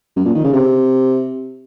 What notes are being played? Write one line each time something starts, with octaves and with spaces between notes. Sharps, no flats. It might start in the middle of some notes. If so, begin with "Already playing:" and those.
F#2
A#2
D#3
C#3
C3